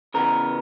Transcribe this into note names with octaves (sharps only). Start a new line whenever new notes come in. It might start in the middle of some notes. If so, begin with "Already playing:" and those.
C#3 E3 B3 A#4